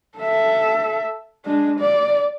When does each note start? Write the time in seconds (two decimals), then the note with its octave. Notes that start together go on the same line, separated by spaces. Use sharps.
0.18 A4 E5
1.45 G#3 D4
1.80 D5